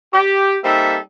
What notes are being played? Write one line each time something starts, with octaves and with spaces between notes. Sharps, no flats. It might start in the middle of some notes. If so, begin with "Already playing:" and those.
G4
G3 A#3 C4 D#4 A4 E5